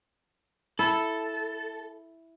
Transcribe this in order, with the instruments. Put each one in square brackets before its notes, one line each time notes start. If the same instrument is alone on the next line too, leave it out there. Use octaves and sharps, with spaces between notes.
[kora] E4 [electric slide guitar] A4